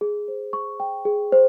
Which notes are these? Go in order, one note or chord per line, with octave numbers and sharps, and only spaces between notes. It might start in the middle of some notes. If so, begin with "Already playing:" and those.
G#4
C5
C#6
G5
G#4
C5